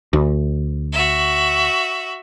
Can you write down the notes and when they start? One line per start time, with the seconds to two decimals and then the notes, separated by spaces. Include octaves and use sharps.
0.13 D2
0.93 F#4 E5